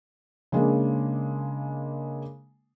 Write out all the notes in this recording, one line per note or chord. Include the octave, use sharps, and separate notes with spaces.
C#3 G#3 A#3 D4